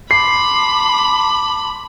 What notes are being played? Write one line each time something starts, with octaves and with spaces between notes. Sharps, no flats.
A5 B5 C6 D6 C7